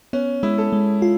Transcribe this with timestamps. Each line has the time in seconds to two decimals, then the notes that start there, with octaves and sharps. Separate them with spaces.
0.13 B3 C#4
0.43 G#3 E4
0.58 A4
0.73 G#3
1.02 F4